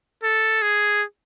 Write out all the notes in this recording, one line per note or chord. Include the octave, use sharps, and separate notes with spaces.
A4
G#4